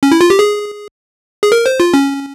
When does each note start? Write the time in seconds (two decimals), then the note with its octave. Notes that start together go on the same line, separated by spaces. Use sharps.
0.03 C#4
0.12 E4
0.21 F4
0.30 G4
0.39 G#4
1.43 G#4
1.52 A#4
1.66 C5
1.80 F4
1.94 C#4